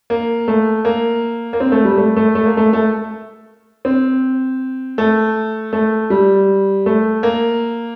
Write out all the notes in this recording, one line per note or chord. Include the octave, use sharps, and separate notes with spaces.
A#3
A3
A#3
A#3
C4
A3
G3
A3
A3
A3
A#3
A3
A3
C4
A3
A3
G3
A3
A#3